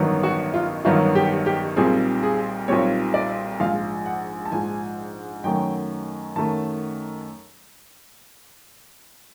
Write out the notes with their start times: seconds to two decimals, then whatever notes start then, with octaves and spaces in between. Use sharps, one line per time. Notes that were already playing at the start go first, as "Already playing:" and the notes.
Already playing: A1 G2 D#3 F#3 B3
0.23 F#4
0.54 F4
0.85 A1 G2 D#3 F#3 B3 F4
1.15 G4
1.46 G4
1.77 B1 A#2 G3 C4 G#4
2.23 G#4
2.68 B1 A#2 G3 C4 C#5
3.14 D5
3.60 A#1 G#2 F3 F5
4.06 F#5
4.46 A5
4.52 A#1 G#2 F3 G#5
5.44 F#2 D#3 F#3 A3 G5
6.36 F#2 D#3 F#3 A3 A5